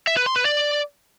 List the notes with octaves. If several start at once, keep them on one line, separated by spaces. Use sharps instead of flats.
E5
B4
C6
B4
D5